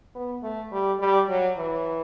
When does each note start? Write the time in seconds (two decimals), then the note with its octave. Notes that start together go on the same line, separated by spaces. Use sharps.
0.15 B3
0.43 A3
0.72 G3
0.99 G3
1.29 F#3
1.57 E3